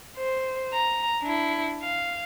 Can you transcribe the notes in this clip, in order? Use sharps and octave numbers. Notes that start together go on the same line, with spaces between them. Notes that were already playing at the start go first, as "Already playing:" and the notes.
C5
A#5
D4 E4
F5